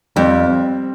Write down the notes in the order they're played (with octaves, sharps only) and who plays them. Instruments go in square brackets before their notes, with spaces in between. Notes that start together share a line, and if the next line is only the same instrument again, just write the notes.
[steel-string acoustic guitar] F2 [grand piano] G3 C4